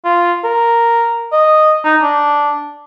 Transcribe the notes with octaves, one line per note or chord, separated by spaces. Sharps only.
F4
A#4
D#5
D#4
D4